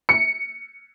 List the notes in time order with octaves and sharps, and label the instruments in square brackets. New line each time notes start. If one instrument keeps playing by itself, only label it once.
[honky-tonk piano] C#7